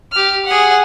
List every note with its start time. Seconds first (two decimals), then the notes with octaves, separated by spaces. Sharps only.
0.12 G4 F6
0.46 G#4 F#5